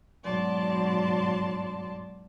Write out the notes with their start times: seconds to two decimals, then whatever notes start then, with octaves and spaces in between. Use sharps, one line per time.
0.23 G#2 B2 F#3 D5 A5 C6